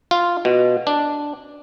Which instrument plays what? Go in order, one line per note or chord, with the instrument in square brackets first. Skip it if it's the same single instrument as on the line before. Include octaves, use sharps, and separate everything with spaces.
[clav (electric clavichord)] F4
B2
D4